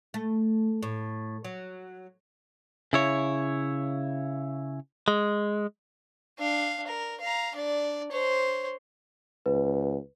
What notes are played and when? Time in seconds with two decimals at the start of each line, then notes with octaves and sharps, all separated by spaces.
0.14 A3
0.83 A2
1.44 F#3
2.93 C#3 E4 C#5
5.08 G#3
6.38 D4 F5
6.87 A#4
7.20 F5 A#5
7.55 D4 D5
8.12 C5 C#5
9.46 C#2 B4